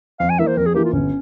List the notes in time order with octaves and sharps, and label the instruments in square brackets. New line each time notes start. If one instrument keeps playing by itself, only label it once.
[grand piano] F2 [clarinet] F5
[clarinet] G#5
[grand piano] E3 A#3 [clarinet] E5
[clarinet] C5
[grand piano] F2 [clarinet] A#4
[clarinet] G#4
[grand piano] E3 A#3 [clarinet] G4
[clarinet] F4
[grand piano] G1 [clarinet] C#4